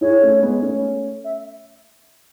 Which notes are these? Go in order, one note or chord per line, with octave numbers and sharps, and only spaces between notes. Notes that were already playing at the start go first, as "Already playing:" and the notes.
E4 G#4 C#5
A3 C#4
G#3 B3
A3 C#4
E5